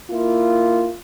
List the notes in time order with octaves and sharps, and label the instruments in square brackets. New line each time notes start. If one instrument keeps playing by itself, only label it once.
[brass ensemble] A#3 E4 F4